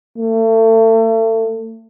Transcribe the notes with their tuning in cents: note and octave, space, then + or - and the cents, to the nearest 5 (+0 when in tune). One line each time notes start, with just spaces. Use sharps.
A3 +35